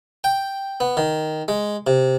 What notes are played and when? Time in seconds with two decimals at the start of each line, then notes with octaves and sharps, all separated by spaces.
0.24 G5
0.80 B3
0.97 D#3
1.48 G#3
1.87 C3